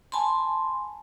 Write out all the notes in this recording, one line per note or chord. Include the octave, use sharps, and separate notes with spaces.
G#5 A5 B5 C6